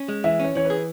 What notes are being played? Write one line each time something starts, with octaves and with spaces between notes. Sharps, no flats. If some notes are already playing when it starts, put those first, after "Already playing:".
Already playing: C#4
G#3
E3 E5
C#4 C#5
E3 C#5
G#4 B4